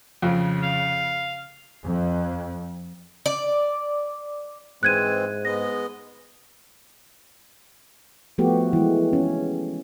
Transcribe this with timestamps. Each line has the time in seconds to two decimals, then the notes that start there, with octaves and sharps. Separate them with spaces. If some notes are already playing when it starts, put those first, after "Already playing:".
0.22 F2 C#3
0.63 F5
1.83 F2
3.26 D5
4.83 G#2 E3 G#3 C4 F#6 G#6 D#7
5.45 G#3 B3 D#5 A#6
8.38 F3 A3 B3 F#4 G4
8.73 E3 G#3
9.13 C#4